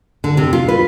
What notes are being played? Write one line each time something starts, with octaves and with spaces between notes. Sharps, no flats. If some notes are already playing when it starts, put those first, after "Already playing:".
D3
C3
F4
B4